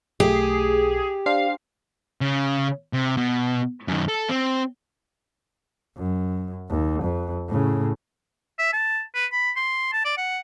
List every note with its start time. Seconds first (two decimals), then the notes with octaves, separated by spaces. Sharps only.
0.20 B1 A3 G4 G#4
1.26 D4 C5 F5 C7
2.21 C#3
2.93 C3
3.17 B2
3.88 F#2 D#3
4.08 A4
4.29 C4
5.97 F#2
6.69 D#2
7.03 F2
7.48 A2 C#3
8.59 E5
8.73 A5
9.15 B4
9.32 B5
9.56 C6
9.93 A5
10.05 D5
10.18 F#5